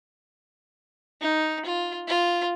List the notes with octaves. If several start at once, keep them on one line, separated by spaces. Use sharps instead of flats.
D#4
F4
F4